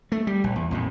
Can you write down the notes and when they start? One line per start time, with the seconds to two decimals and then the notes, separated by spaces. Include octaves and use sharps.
0.12 A3
0.27 G3
0.44 A#1
0.56 E2
0.71 A#1 F2 A2